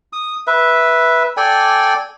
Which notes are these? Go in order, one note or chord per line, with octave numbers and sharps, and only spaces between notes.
D#6
B4 E5
A4 D5 G5 G#5